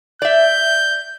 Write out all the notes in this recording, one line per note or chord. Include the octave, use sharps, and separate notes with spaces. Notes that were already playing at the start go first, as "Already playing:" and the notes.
D5 E5 G6